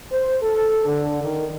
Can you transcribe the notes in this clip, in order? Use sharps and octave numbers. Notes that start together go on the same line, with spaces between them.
C5
A4
D3
D#3